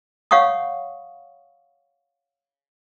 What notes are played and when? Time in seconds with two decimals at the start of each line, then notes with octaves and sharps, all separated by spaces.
0.31 C#5 F5 F#5 C#6 D#6